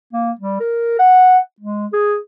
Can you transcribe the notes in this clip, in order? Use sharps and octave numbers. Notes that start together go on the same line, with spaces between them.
A#3
G3
A#4
F#5
G#3
G#4